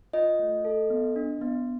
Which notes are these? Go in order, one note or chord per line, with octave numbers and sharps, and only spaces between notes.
F4 D#5
A3
A4
B3
D4
B3